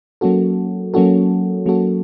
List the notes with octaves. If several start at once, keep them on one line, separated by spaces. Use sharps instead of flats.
F#3 A#3 C#4 F#4 A4
F#3 A#3 C#4 F#4 A4
F#3 A#3 C#4 F#4 A4